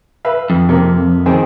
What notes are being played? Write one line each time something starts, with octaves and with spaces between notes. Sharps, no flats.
B4 E5 F5
F2
C3 A#3
D#3 C4 G#4